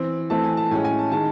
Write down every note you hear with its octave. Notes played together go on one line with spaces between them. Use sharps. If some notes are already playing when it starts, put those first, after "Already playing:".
Already playing: E3 C4
E3 A3 C4 A5
G#5
A5
A2 G#3 C#4 G#5
G#5
A5
D#3 G#3 C#4 A5